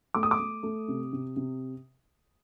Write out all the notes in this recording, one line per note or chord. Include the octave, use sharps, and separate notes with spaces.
A3 D6
D#6
D6
A3
A3
C3
C3
C3